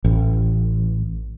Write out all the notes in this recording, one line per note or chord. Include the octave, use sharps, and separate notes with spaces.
A1